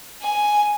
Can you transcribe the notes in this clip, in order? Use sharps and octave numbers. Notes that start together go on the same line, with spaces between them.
G#5